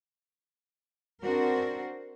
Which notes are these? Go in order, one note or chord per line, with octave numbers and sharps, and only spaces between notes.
C4 D4 F#4 A#4 C5